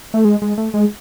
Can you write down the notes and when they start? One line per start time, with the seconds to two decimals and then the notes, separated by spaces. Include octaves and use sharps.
0.14 A3
0.25 G#3
0.42 G#3
0.58 A3
0.74 G#3